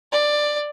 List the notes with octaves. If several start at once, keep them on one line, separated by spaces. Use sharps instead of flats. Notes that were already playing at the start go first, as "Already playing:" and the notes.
D5